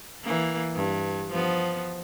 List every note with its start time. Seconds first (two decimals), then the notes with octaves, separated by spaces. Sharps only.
0.23 E3 A#3
0.75 G2
1.31 F3 B3